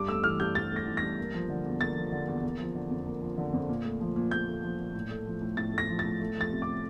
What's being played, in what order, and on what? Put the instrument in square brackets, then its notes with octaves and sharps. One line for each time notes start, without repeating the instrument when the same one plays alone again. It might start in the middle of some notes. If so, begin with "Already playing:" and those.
Already playing: [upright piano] G2 D6
A3 E6
E3 F6
G2 G6
G2 A6
A3
A#6
E3
A#6
G2
A#3
F3
D3
E2
A#3 A6
F3
D3
E2
A#3
F3
D3
F2
A#3
F3
D3
F2
A#2
A3
F3
A#2
A#2 G6
A3
F3
A#2
A2
A3
F3
A2
A2 A6
A3 A#6
F3
A6
A2
A3
F3 A6
C3
D6